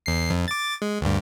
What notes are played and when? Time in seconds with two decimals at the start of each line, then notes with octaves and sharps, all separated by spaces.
0.06 E2 C7
0.30 F2
0.48 D6 A6
0.82 G#3
1.01 D2 G2